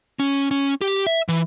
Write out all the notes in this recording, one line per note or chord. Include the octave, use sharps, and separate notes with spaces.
C#4
C#4
G4
E5
E3